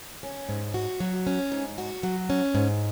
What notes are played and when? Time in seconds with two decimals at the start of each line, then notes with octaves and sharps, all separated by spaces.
0.23 C#4
0.49 G#2
0.74 F#4
1.00 F#3
1.27 C#4
1.52 G#2
1.78 F#4
2.03 F#3
2.30 C#4
2.55 G#2